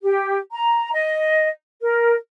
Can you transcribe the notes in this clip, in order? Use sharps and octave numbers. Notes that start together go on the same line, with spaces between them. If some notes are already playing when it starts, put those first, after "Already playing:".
G4
A#5
D#5
A#4